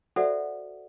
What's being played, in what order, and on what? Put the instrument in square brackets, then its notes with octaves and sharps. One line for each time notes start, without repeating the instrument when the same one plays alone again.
[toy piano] F#4 A4 C5 D5 E5 F#5